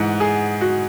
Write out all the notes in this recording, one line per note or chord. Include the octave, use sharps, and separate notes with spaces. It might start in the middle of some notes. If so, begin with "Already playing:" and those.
Already playing: G#2 E3 F#5
G#4
F#4